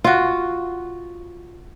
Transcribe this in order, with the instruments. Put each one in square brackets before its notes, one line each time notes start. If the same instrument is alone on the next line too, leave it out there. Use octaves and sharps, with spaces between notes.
[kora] F4 F#4